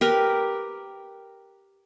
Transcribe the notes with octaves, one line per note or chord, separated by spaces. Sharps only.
G4 A#4 B4